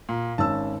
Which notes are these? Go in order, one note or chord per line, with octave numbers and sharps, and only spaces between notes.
A#2
G#1 C#4 A5 E6